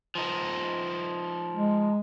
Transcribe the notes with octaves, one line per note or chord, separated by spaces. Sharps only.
F3 D#4
G#3